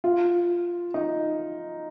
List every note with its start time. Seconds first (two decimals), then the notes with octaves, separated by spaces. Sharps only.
0.04 F4
0.94 D#4